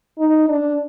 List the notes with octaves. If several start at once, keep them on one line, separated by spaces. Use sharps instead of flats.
D#4
D4